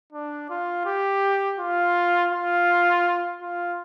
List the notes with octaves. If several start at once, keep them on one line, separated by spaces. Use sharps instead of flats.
D4
F4
G4
F4
F4
F4